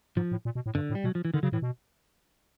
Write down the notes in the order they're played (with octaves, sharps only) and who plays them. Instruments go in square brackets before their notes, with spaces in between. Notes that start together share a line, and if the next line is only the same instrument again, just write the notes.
[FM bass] G#2 [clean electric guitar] F3
[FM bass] A2
A#2
B2
A2
[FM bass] G2 [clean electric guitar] D3
[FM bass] A2
[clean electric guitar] G3
[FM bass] B2 [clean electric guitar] F#3
[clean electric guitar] F3
E3
[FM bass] D3 [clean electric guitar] D#3
[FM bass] C#3 [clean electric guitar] F#3
[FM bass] A2 [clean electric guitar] E3
[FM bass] B2